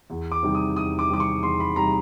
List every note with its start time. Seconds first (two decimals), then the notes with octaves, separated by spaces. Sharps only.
0.10 E2
0.32 D6
0.43 C3 D#3 G3
0.55 D#6
0.76 E2 D#6
0.99 D6
1.10 C3 D#3 G3 D6
1.20 C#6
1.42 E2 C6
1.60 B5
1.76 C3 D#3 G3 A#5